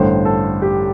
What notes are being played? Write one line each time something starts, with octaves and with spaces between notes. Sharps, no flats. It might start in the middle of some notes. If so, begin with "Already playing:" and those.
Already playing: A1 G2 D3 C5
A4
G4